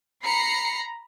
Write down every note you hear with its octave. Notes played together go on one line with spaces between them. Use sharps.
A#5 B5 C7 C#7